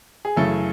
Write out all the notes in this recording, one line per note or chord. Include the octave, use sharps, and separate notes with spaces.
G#4
F#2 C#3 E3 A3 A4